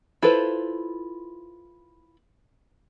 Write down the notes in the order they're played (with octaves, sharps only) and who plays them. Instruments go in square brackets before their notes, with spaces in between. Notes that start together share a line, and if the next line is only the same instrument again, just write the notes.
[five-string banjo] E4 F4 A4 B4 C5